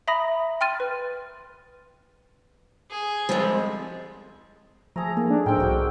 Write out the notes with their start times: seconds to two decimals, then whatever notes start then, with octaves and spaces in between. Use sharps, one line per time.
0.08 E5 A#5 B5 D#6 A#6
0.61 G5 C6 F6 A6 D#7
0.80 B4
2.90 G#4
3.29 F3 G3 G#3 C4 A4
4.96 F3 A3 G#4 A#5
5.17 D#3 A#3
5.30 D4
5.46 A2 C4 A#4 G5
5.58 C2 C4 F#4 G4